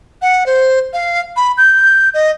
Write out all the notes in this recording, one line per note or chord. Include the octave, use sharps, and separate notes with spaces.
F#5
C5
F5
B5
G6
D#5